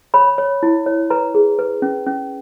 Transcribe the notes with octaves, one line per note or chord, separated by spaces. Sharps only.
C#5 B5
C#5
E4
C#5
B4 A#5
G#4
B4
C#4
C#4